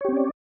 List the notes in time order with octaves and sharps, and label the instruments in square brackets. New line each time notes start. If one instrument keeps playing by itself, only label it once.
[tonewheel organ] C#5
G4
C4
C#4
D5